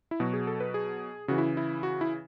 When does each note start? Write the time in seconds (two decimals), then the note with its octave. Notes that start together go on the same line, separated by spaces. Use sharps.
0.11 E4
0.20 B2 F#3 F#4
0.33 G#4
0.47 A4
0.60 B4
0.74 G#4
1.28 C#3 E3 F#4
1.38 E4
1.57 E4
1.83 F#4
2.01 E4